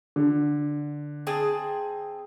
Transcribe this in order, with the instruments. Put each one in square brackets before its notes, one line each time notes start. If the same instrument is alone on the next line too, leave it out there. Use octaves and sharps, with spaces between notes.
[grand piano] D3
[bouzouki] C4 G#4 A5